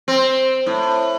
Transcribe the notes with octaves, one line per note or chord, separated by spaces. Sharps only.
C4
A2